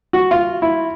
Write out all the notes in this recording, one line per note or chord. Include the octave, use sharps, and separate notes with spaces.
F#4
F4
E4